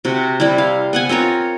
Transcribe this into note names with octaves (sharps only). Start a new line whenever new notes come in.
C3 F#4
G3 E4
F5
B3 F#5 G#5
C4 F4 A#4 C#5